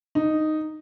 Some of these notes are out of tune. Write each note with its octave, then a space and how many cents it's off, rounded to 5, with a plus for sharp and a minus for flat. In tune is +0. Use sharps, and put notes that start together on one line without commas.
D#4 -5